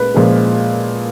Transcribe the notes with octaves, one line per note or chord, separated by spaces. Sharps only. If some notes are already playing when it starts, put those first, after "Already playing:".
Already playing: A#2 G#3 B4
A#2 F3 G#3